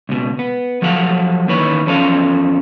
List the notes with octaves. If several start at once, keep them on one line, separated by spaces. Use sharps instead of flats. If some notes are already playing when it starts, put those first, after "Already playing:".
C#2 B2
B3
F3 F#3 A4 F5 F#5
D#2 D#3 E3 B4 C#5 B5
E2 F3 C#4 A4 C5 F5